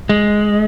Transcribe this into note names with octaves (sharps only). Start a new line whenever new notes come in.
G#3